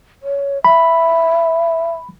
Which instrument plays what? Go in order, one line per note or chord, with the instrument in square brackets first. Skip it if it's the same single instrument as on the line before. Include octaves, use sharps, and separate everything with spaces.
[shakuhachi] C#5
[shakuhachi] E5 [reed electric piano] B5